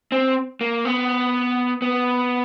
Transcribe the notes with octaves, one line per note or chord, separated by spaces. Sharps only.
C4
A#3
B3
B3